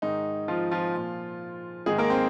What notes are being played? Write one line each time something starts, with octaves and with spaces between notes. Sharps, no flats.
G#2 D#3 D#4
F3 F4
F3 F4
A#2 F3
G#2 D#3 G#3 G#4
A#3 A#4
C4